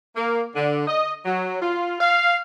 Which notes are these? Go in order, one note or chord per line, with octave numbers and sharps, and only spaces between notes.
A#3
D3
D#5
F#3
F4
F5